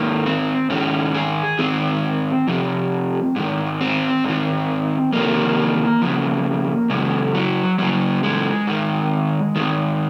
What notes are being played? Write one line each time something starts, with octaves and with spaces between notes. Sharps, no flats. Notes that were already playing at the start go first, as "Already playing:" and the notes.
Already playing: G#2 D#3 A#3
C4
G#2 D#3 C#4
G#4
G#2 D#3 C4
F2 C3
G#2 D#3
C4
G#2 D#3
F2 C3 D#3 A#3
F2 C#3
F#2 C#3 G#3
F#3
F#2 C#3 F#3
G#3
G#2 D#3
G#2 D#3